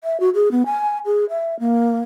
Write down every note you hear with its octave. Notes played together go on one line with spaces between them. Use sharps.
E5
F#4
G#4
B3
G#5
G#4
E5
A#3